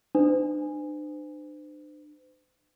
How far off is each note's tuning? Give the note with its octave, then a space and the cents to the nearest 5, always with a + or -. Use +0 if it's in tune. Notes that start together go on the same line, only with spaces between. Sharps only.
D4 +40 C5 -40